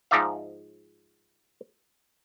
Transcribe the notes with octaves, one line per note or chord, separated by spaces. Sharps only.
G#2 F3 D#4 D5 E5 F5